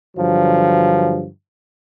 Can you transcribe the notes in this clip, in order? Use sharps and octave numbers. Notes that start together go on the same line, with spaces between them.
G2 D3 F3 F#3